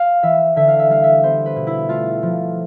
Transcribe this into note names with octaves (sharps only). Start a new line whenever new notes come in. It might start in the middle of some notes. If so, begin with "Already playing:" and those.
Already playing: F5
E3 E5
D3 E5
F5
E5
G3 F5
E5
B3 C5
B4
B2
E4
A3 F4
F3